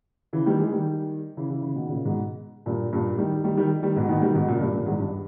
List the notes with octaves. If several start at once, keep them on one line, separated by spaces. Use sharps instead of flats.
C#3 E3
D#3 G3
E3 G#3
D#3 G3
C#3 E3
C#3 E3
C#3 E3
B2 D#3
A#2 C#3
G#2 B2
G2 A#2
G2 A#2
D#3 G3
D#3 G3
D#3 G3
D#3 G3
G#2 B2
B2 D#3
D#3 G3
G#2 B2
A#2 C#3
G2 A#2
G2 A#2
E2 G#2
G2